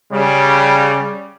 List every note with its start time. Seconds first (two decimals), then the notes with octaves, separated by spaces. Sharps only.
0.12 C#3 G3